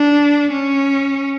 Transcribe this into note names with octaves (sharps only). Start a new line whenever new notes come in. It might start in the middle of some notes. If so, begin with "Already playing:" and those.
Already playing: D4
C#4